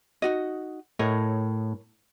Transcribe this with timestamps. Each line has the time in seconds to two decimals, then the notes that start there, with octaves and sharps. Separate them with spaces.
0.22 D#4 F#4 D#5
0.99 A2 A#4 C#5 D#5